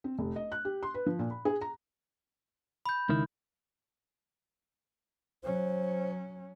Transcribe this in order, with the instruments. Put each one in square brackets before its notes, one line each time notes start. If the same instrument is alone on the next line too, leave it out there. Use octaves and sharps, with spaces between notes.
[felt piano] C4
F1
D#5
F#6
G4
C6
B4
F3
A#2
B5
G#4
A#5
[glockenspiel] B5 G6
[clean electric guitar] C#2 D#3 E4
[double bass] F#3 C#4 [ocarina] C5